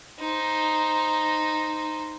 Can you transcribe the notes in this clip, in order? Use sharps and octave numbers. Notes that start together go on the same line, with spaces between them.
D#4 C5